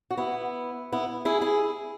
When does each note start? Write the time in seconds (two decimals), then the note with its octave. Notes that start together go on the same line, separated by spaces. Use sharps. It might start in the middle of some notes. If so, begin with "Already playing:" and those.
0.11 F#4
0.17 B3 E4
0.92 B3 E4
1.25 E4 G#4
1.41 E4 G#4